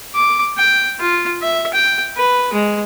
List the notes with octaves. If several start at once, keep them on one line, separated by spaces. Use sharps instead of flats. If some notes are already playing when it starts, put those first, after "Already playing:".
D6
G5
F4
E5
G5
B4
G#3